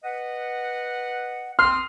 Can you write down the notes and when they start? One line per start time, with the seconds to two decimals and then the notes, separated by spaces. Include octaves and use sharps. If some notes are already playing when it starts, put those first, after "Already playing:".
0.04 B4 D#5 F#5
1.59 C4 C6 D#6 F6